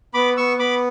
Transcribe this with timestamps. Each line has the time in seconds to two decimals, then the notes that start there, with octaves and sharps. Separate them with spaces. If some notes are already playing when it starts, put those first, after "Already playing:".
0.14 B3 B5 D6
0.37 B3 C#6 E6
0.59 B3 B5 D6